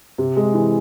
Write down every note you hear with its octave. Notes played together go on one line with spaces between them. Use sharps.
C3
G#3
E3